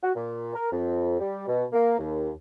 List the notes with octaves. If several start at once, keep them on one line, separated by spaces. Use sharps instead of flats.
F#4
A#2
A#4
F2
G3
B2
A#3
D#2